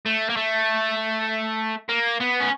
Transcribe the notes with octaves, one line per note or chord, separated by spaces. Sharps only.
A3
A#3
A3
A#3
B3
C#4